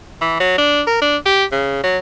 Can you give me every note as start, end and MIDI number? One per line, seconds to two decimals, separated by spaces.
0.21 0.39 52
0.40 0.55 54
0.58 0.82 62
0.87 0.97 70
1.02 1.17 62
1.26 1.44 67
1.52 1.82 49
1.84 1.98 54